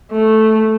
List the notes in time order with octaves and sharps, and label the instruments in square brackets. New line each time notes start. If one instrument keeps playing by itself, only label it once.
[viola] A3